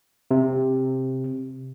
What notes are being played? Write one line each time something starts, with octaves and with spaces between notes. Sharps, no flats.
C3